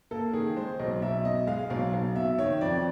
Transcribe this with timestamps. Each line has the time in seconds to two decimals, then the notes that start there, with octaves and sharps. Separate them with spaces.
0.11 A#3 A4
0.33 D#3 G#4
0.57 G#3 C5
0.79 B1 D#5
1.02 B1 E5
1.25 B2 D#5
1.47 G#3 F5
1.70 B1 F5
1.93 B1 F5
2.16 B2 E5
2.38 D#3 C#5
2.61 F2 D5